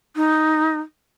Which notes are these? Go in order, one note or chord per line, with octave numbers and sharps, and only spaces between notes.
D#4